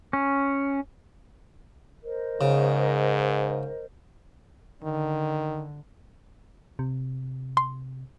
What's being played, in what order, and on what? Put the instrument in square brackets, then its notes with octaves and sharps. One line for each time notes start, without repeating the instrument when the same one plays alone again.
[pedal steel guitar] C#4
[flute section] A#4 C5 D#5
[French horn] G#2 [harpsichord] C#3
[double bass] D3 [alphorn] D#3
[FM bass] C3
[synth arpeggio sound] C6